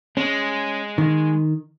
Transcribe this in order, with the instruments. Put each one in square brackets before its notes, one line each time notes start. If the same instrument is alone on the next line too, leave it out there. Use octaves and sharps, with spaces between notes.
[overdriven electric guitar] G#3 [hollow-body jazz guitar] C#4
[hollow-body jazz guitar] D#3